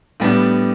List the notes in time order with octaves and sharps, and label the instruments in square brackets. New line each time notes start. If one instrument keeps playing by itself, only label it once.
[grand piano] A2 G3 B3 D4